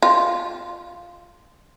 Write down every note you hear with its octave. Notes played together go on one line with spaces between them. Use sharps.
F4